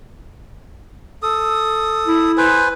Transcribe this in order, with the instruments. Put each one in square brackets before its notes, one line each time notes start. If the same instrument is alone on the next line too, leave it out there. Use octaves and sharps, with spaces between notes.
[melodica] A4 D#6
[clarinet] E4
[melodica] B4 C5 G#5